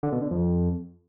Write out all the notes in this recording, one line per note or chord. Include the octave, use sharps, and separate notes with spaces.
D3
B2
D3
F2